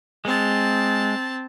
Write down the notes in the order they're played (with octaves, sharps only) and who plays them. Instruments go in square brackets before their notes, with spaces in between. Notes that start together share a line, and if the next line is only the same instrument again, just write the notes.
[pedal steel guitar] G#3 [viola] C4 A5